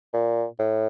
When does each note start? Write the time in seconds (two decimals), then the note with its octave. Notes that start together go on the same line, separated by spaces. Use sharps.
0.14 A#2
0.59 A2